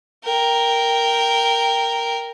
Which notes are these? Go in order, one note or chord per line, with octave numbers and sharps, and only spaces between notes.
A#4 G5